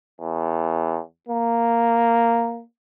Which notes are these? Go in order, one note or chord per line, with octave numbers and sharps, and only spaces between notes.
E2
A#3